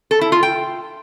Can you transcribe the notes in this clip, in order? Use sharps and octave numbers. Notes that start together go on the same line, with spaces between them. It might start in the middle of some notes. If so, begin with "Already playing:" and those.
A4
E4
F4
G5